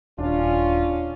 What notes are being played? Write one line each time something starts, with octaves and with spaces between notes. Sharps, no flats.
D#1 C#4 D4 F4